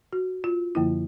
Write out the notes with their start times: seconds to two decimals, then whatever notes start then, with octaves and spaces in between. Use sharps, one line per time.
0.13 F#4
0.44 F4
0.75 F#2 D3 F3 A#3 E4